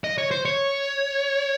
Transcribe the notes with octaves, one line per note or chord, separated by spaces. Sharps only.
D#5
C#5
C5
C#5